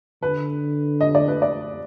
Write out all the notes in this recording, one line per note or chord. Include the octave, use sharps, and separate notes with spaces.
D3 B4
D#5
D5
B4
D5